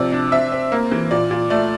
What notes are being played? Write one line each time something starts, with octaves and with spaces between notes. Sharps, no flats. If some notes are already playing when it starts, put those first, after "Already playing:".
Already playing: C3 F3 D5
D4
C4 E5
C4
A#3
E3
A#2 D5
A#2
A3 D5